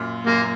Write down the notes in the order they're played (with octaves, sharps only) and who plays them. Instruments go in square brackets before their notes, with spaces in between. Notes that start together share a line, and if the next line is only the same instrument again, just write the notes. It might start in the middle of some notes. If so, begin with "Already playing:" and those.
Already playing: [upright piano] F#2 A#2
[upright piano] F#2 A#2 [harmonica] A#3